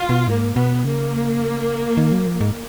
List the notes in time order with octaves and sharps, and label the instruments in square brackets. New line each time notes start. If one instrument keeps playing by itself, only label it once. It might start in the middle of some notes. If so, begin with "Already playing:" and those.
Already playing: [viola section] F4
[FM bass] B2
[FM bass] G#2 [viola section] A#3
[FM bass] B2 [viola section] B3
[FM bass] C#3 [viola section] A#3
[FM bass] D#3
F#3
F3
G#2